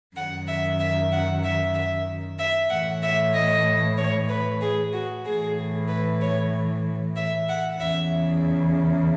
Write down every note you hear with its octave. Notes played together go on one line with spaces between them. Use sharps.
F#2 D#3 F#5
E5
E5
F#5
E5
E5
E5
A2 E3 F#5
E5
D#5
C#5
B4
G#4
F#4
A2 E3 G#4
B4
C#5
E5
F#5
E2 C#3 E3 E5